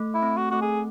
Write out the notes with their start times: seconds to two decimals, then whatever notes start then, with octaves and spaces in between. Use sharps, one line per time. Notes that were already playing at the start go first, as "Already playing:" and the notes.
Already playing: A3
0.14 E4
0.22 C4
0.37 F#4
0.51 A3 F#4
0.62 G#4